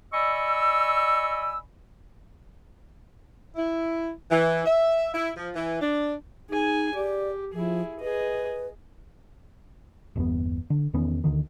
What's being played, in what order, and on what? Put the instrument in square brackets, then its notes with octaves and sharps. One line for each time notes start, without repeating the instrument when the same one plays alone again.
[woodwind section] D5 D#5 G#5 B5 C#6 E6
[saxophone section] E4
E3
E5
E4
F3
E3
D4
[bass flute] D#4 [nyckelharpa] G#4 G#5
[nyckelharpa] G4 [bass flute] D5
[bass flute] F3 [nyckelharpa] E4 G#4
[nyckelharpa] G#4 D#5 [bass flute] B4
[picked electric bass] G1 E2 B2 B3
D3
E2 D#3 B3 C#4
D2 D3 D#3